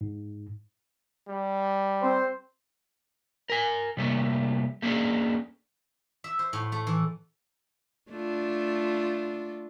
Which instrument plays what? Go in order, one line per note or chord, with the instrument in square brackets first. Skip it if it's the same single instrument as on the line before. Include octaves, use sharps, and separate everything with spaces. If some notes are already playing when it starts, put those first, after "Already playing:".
[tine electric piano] G#2
[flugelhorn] G3
[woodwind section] C4 C5
[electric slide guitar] A#4 G#5
C3 G3 A3 A#3
A3 A#3 C#4 D4 G#4 A4
[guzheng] E5
C5
A2
A3
E3
[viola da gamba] A3 D4 F4